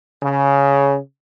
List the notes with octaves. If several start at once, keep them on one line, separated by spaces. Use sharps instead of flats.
C#3